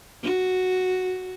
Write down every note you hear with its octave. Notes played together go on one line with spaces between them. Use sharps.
F#4